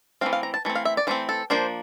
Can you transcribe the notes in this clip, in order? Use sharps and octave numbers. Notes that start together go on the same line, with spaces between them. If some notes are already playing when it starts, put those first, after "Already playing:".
E3 A3 C4 F5
F5
A#5
A5
E3 A3 C4
F5
E5
D5
E3 A3 C4 C5
A4
F3 A#3 D4 C5